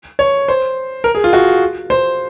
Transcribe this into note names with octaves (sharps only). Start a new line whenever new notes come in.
C#5
C5
A#4
G#4
F4
F#4
C5